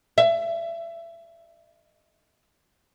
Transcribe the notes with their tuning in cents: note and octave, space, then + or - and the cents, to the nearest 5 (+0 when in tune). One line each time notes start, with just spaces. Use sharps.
E5 +30